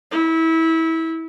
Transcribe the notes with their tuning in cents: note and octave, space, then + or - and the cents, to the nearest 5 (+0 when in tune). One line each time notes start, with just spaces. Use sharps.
E4 -25